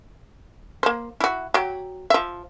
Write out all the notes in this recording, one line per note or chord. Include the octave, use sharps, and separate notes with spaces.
A#3 C5
E4 F#4
F#3 G4
F3 E5